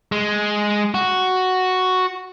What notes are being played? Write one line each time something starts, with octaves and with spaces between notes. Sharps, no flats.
G#3
F#4